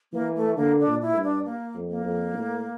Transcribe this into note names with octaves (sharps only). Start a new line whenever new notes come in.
E3 A#3
A3
D3 A#3
D4
A#2
E4
G2
D4
A#3
F2
A#3
F2
A2